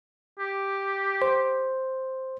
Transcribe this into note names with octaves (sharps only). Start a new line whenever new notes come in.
G4
C5